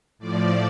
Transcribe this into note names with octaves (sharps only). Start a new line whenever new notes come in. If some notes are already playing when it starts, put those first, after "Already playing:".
A2 F3 D5